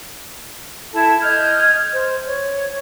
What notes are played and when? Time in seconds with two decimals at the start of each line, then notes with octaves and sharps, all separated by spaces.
0.93 E4 A4 A5
1.22 D#5 F6 G6 G#6
1.92 C5
2.25 C#5